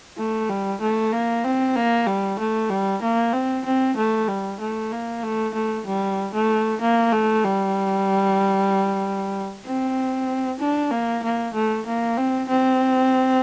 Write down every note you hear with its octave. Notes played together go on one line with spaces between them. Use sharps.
A3
G3
A3
A#3
C4
A#3
G3
A3
G3
A#3
C4
C4
A3
G3
A3
A#3
A3
A3
G3
A3
A#3
A3
G3
C4
D4
A#3
A#3
A3
A#3
C4
C4